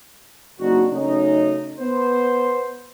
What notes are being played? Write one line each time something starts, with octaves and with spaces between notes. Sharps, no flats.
F#1 C4 D4 D#4 F#4
C#3 F#3 A3 C#4 D#4
B3 C5